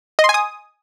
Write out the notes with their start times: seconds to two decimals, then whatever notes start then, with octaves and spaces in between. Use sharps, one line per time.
0.19 D#5
0.24 C6
0.29 G#5
0.34 D#6